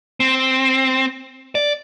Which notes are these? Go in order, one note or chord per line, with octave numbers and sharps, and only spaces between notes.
C4
D5